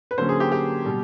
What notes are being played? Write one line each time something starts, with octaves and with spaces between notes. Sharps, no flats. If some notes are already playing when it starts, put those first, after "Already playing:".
B4
D3 F#3 A#3 C#4 C5
G#4
G4
G4
B2 G3